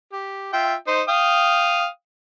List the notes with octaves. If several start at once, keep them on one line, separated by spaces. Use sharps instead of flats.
G4
F4 E5 G5
D#4 C5
F5 G5 D#6